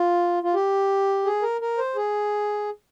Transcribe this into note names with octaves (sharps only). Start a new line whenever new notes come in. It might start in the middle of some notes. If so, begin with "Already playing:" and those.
Already playing: F4
F4
G4
G#4
A#4
A#4
C5
G#4